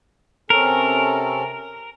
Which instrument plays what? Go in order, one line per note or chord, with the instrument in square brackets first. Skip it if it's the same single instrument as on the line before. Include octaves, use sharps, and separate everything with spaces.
[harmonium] C3 C#4 A4 [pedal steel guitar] A#4